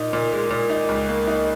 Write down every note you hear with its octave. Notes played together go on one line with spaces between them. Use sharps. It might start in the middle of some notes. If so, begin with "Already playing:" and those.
Already playing: A#2 D#4
A#2
G#3
A#2
D#4
C#2
A#3
D#4